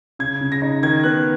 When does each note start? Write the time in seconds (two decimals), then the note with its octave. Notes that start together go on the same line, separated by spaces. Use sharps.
0.19 C#3 G#6
0.41 C#3
0.52 A#6
0.62 D#4
0.83 D#3 G#6
1.04 B3 F#6